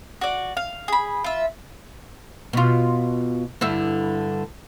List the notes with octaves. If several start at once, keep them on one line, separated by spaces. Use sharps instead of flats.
F#4 D5
F5
G#4 B5
F4 E5
B2 F4
G2 D3 E4